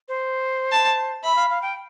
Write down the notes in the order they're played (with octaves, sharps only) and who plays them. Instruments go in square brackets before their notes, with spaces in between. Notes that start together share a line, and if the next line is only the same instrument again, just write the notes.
[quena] C5
[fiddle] A5
[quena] E5 [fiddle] B5
[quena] F5
F5
G5